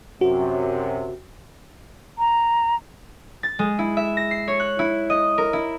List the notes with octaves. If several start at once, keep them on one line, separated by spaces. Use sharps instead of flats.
F#2 C3 F#4
A#5
A6
G#3
E4
E5
A#6
C7
C#5
F#6
E4
D#5
A#4
E4